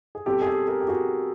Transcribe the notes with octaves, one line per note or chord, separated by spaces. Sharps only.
G#4
B2 G3 C4 G4 A4
G#4
G4 A4
G#4 A#4
G4
F#4 G#4